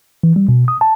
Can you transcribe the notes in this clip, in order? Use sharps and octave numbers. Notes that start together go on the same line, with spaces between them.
E3
G3
B2
D#6
A5